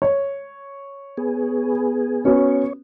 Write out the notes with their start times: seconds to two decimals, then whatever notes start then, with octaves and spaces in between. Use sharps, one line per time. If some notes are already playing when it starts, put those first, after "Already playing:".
0.02 C#5
1.17 B3 G#4
2.25 B3 C#4 F#4 C#5